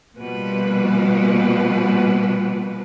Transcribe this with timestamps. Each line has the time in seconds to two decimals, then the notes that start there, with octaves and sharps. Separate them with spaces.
0.16 B2 F3 G3 A#3 B4